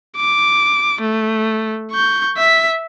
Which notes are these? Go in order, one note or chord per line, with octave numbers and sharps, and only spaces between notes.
D6
A3
C#6 G6
E5 B6